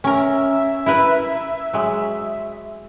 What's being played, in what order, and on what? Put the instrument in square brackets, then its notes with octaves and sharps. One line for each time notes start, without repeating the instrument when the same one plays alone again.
[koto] C#4 A#4 [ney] E5
[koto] E4 A#4 B4
F#3 G#3